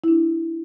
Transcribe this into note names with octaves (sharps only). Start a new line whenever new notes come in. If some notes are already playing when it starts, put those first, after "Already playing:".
E4
D4